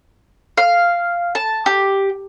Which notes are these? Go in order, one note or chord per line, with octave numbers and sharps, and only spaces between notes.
F5
A5
G4